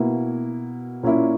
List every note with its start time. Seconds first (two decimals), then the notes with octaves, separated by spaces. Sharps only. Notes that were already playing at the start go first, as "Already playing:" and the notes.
Already playing: B2 A#3 E4
1.03 A#2 A#3 C#4 E4